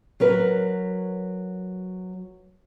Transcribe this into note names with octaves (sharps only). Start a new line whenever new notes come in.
F#3 A#4 B4 C#5